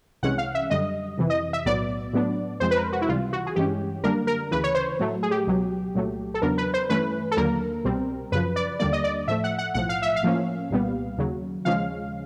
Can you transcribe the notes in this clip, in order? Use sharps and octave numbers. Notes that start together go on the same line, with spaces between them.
C2 C3 E3 G#3 C#4 F#5
F5
E5
F#2 D3 G3 D#5
F2 C3 E3
D#5
E5
B1 A2 F#3 B3 D5
A2 F#3 B3 D4
F2 C3 F3 G#3 C4 C5
B4
A#4
F#4
E4
C#2 C3 E3 G3 F4
F#4
G#4
G2 E3 G#3 C#4 G4
F#2 D3 G3 A#3 D4 A#4
A#4
D2 C#3 E3 B4
C#5
C5
A2 F#3 A3
G#4
G4
C#2 B2 F#3
C2 A#2 F#3 A3
A4
E2 C#3 F#3 B3 D4 A#4
B4
C5
G2 E3 A3 C#4 B4
A4
D#2 D3 F#3 A#3 A#4
C2 B2 G3 C4
F#2 C#3 F3 B4
D5
D#2 D3 G3 A#3 D5
D#5
D5
A2 F3 A3 E5
F#5
F#5
B1 A2 F3 F#5
F5
E5
F5
A2 F3 A#3 C#4
C2 A#2 G3 B3
D#2 C#3 F#3
D#2 C#3 F3 G#3 C#4 F5